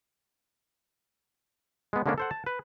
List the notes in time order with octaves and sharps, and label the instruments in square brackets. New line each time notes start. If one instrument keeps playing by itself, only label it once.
[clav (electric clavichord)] G#3 B3
D3 G#3 A#3 C#4 D4
A4 C5 F#5
A5
B4